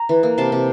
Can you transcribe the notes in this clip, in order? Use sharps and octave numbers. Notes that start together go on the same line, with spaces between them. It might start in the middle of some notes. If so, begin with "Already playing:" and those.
Already playing: A#5
E3
A#3
C3 A5 C6
C3